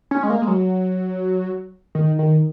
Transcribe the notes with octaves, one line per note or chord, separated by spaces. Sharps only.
C#4
G#3
A#3
G#3
F#3
D#3
D#3